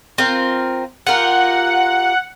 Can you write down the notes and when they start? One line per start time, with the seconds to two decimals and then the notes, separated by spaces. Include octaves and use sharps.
0.18 C4 F4 A#4
1.07 F4 G4 A#4 F#5